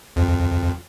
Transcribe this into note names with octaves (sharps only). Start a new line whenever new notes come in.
F2